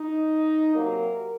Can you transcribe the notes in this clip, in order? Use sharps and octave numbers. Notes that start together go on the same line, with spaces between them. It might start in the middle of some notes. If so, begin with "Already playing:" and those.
Already playing: D#4
C3 F#3 A#3 A#4